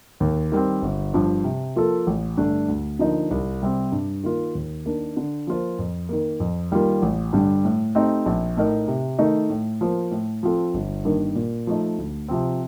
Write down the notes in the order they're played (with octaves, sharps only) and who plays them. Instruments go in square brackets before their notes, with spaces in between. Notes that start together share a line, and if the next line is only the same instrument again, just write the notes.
[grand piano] D#2
D#3 G3 C4
G1
G2 F3
C3
F3 A#3 F4 A4
A1
G2 D3 A3 D4
D2
D3 F3 A#3 D#4
C2
C3 G3 C4
G2
D#3 A#3 F4
D#2
D#3 A#3 D4
D3
F3 A#3 F4 C5
F2
D#3 A#3
F2
D#3 G3 A#3 F4
A1
G2 D3 G3
A2
A3 C4 D#4 G4
A#1
A2 A3 D#4 A#4
C3
D#3 A3 D#4
A2
F3 A#3 F4 C5
A2
F3 C4 F4 A4
G1
G2 D#3 A#3
A#2
F3 A3 D#4
D2
C3 F3 C4